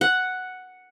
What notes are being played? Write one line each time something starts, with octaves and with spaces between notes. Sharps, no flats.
F#5